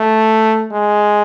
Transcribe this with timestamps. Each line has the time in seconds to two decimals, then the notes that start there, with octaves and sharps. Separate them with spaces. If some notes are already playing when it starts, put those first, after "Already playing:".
Already playing: A3
0.72 G#3